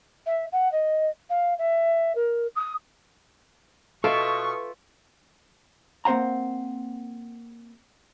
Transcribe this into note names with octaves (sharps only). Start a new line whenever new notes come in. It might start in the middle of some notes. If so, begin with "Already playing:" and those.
E5
F#5
D#5
F5
E5
A#4
D#6
B2 F4 A4 E5 G5 C#6
A#3 C4 C5 F#5 A#5